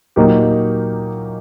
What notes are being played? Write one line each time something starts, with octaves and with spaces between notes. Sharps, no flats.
A#2 F#3 A#3 D#4 G4